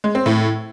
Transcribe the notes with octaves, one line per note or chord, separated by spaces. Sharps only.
G#3
C4
A2